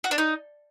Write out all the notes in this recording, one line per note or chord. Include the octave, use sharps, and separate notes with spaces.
F#4
D4
D#4